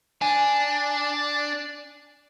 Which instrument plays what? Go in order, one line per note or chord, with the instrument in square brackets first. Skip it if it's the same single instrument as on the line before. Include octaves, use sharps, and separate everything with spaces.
[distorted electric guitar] D4 [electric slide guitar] G#5